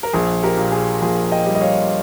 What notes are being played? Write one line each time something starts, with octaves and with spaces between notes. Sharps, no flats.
A#4
A#1 G#4
G4 A#4
A#2
G#4
A#1 G#4
D#5 G5
G3
D#5
C#5 F5